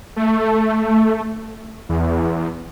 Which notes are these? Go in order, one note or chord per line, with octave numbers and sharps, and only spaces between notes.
A3
E2